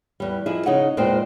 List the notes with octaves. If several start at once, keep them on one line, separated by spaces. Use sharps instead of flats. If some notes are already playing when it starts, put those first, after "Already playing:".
E2 G3
F3 D#4 E4 G#4
C#3 D#4 G#4 F#5
E2 A#2 G#3 C4 C5 G5